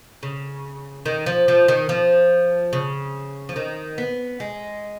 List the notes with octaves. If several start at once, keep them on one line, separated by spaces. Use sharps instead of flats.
C#3
D#3
F3
F3
D#3
F3
C#3
F3
D#3
B3
G#3